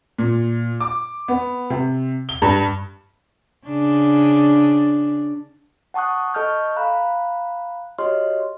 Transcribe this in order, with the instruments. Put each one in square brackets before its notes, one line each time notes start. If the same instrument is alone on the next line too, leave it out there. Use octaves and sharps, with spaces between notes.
[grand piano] A#2
D6
B3
C3
G7
G2
[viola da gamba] C#3 D4
[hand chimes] F#5 A5 C#6 D#6 F#6
A4 D#5 A5 C#6 F6 G6
F5 A#5 B5 F#6
F#4 G4 C#5 D#5 C6 F6